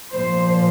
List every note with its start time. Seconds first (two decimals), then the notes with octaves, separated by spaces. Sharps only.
0.12 A#2 F3 C5